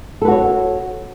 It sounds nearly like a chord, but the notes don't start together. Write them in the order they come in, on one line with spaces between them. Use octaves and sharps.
A4 B4 F#4 C#5